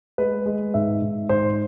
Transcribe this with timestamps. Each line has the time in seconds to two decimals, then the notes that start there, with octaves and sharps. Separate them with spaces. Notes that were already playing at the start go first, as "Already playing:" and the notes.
0.18 G#3 B4
0.46 G#3
0.74 G#2 E5
1.02 G#2
1.29 G#2 C5